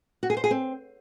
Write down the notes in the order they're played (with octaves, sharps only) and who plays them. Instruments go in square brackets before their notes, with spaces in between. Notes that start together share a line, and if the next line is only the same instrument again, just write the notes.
[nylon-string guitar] F#4
G#4
C5
G#4
C4